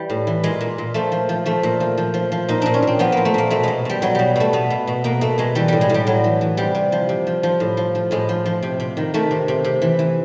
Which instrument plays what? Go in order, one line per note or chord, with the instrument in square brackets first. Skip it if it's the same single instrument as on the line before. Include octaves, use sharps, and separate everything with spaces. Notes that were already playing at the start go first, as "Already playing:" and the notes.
Already playing: [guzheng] E3 G3
A2
E3
A#2 G#3
A#2
A#2
F3 A3
F3
F3
F3 A3
A#2
F3
F3
F3
F3
A#2 D#4
A#2 D4
C#4
A#2 C4
F3 B3
A#2 A#3
A3
A#2 A#3
B2 A3
B2 G#3
B2 G3
B2 F#3
B2 G3
B2 A3
B2 B3
B2
B2
B2 A#3
B2 A3
B2 G#3
E3 G3
A2 G3
G#3
A2 G3
A2 F#3
E3
E3
C3 G3
C3
F3
C3
F3
F3
A2
F3
F3
A2 G#3
F3
F3
C3
C3
D#3
D#3 A3
C3
C3
C3
E3
E3